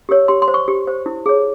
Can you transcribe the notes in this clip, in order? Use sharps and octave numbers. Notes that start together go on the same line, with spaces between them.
G4 A#4 C#5
G4 C6
C6
C5
C#6
G4
C5
E4
G#4 C#5